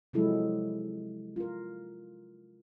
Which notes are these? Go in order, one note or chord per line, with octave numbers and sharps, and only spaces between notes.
C3 F3 F#3 G#3 E4 A4
F4 A#4